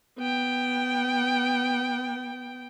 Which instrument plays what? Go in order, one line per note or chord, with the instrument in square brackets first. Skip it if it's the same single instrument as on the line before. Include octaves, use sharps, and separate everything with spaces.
[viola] B3 G5